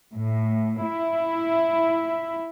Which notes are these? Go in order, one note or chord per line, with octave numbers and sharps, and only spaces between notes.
A2
E4